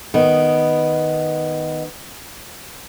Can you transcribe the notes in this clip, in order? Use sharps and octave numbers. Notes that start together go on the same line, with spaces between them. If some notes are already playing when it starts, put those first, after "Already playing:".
D#3 B3